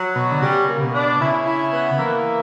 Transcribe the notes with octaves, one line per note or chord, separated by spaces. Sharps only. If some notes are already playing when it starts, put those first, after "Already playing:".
Already playing: F#3
B2 F#4
D3
C#3 G3
A#3
B2
D4
C#3 E4
E4
B3
E3 A#3